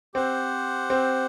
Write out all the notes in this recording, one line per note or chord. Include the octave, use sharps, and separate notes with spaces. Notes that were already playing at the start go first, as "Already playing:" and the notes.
C4 G4 C5 F#5
C4